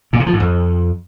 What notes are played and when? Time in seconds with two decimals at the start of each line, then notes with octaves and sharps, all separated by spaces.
0.13 A#2
0.20 C3
0.26 F3
0.33 G#2
0.40 F2